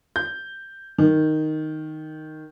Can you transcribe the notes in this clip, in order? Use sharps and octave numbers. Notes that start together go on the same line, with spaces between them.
G6
D#3